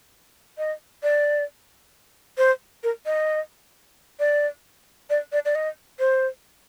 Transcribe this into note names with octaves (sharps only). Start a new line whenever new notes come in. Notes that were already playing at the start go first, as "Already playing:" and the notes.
D#5
D5
C5
A#4
D#5
D5
D5
D5
D5
D#5
C5